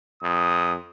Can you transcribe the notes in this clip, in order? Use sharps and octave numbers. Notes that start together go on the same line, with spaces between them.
F2 D#6